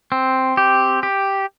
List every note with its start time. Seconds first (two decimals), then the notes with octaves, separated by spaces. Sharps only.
0.12 C4
0.57 G4
1.03 G4